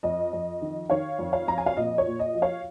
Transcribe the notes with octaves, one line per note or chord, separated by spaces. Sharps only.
F2 D#5
F2
D#3
D#3 C#5 F5
F2
C#5 F5
F2 A#5
G#5
F5
A#2 D#5
C#5
A#2
D#5
F3
C#5 F5